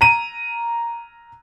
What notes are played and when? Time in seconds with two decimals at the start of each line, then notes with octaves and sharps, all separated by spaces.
0.01 A#5 D#7